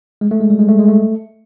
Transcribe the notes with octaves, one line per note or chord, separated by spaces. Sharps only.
G#3
A3
G#3
G3
G#3
A3
G#3
A3